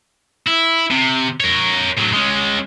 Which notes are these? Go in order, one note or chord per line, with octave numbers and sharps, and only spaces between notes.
E4
C3
A#4 C#5
A2 F#3
G#3 C#4